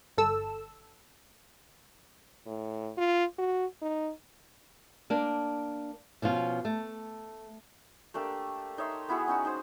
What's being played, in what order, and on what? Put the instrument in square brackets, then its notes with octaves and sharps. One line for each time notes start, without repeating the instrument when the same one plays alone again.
[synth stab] G1 A4 E6
[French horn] A2
F4
F#4
D#4
[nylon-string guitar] A#3 D4
B2 F3 C#4 F4
A3
[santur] A3 A#3 D4 G4
D#4 C#5 E5 C6
B3 E4 F#4 G#4
C#4 D#4 F#4
D#4 C5